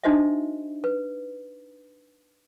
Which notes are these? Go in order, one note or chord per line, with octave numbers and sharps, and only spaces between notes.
D4 D#4 F#4 C5 D#5 E5
B4